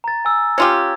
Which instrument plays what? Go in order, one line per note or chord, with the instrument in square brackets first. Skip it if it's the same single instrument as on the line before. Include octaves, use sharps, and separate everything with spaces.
[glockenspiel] A#5 A6
G#5 E6
[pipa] C#4 F4 G4 [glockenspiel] G#6